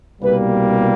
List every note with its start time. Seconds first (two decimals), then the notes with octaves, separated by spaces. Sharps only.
0.22 C2 B2 G3 A#3 B4